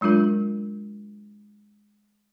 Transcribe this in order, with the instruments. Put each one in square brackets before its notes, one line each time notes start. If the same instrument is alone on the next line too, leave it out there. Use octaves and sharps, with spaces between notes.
[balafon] F#3 G#3 D4 F4 A#4